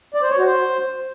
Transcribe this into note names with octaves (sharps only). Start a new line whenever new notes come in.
D5
C5
C#5
F#4
C5